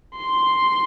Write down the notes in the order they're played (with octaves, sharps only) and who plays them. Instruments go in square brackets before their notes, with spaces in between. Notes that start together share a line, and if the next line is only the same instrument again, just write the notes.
[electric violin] C6